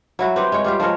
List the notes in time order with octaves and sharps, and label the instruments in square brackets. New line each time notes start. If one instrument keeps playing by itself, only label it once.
[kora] F#3 E4 F#4
C4 G4 B4
G#3 C#5
G3 F4 G4
F3 G#3 A#4 C#5